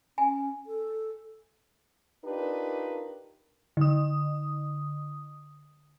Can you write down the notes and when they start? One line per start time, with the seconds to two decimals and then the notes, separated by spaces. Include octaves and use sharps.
0.18 C#4 G#5
0.66 A4
2.25 D4 D#4 F4 G4 A#4 B4
3.77 D3 D#6